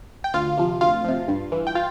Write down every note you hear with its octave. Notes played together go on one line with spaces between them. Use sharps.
G5
D2 F4 F5
C3 F3
D2 F4 F5
C3 F3
G2
E3
G5
F4 F5